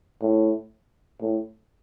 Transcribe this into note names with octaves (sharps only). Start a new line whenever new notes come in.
A2
A2